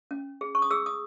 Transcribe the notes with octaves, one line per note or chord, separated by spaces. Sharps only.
C#4
G#4
C#6
D#6
G#4 E6
D#6